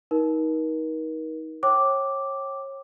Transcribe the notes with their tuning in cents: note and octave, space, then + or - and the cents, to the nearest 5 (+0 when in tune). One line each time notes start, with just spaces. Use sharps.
D#4 +25 A#4 +35
C#5 -30 G5 -25 D6 -5